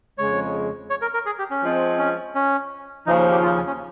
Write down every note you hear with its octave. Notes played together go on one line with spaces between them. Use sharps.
F2 C#3 G#3 C#5
C#5
A#4
A#4
G#4
G4
C#4
F3 G#3 C4
C#4
C#4
D#2 C#3 F3 D#4
G4
F4
C#4
C#4